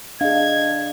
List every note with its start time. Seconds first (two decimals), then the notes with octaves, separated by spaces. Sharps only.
0.21 D4 G#4 D#5 F5 G#6